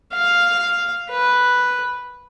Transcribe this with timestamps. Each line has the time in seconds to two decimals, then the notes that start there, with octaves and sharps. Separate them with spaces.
0.14 F5
1.10 B4